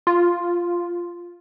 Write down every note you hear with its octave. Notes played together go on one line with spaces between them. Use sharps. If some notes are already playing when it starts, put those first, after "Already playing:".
F4